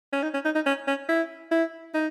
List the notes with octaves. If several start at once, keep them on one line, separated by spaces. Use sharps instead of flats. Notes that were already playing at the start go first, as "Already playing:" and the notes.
C#4
D#4
C#4
D#4
D#4
C#4
C#4
E4
E4
D#4